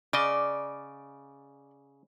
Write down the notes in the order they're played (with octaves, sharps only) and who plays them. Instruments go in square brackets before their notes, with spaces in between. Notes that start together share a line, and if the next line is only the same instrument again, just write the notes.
[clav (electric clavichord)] C#3 D#5 [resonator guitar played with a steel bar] D5